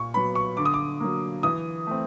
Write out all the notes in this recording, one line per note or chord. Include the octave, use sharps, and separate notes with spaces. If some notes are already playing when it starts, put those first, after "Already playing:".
Already playing: A#2 C#6
F#3 B3 B5
C#6
D3 D6
D#6
D6
F#3 A#3
E3 D#6
A3 C4